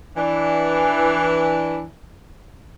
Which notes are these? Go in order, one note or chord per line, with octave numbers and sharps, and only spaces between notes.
E3 D4